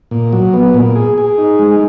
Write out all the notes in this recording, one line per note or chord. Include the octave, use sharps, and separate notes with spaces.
A#2
F#3
B3
A#2
G#4
G#4
D#4
G#3